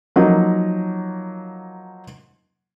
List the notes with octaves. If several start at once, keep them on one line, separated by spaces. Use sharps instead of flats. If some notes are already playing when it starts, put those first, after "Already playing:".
F3 F#3 A#3 D#4